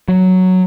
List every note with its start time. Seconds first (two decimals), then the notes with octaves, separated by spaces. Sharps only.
0.08 F#3